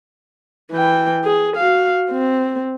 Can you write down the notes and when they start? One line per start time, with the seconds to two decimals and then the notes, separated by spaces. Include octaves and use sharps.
0.71 E3 G5
1.24 G#4
1.57 F#4 F5
2.11 C4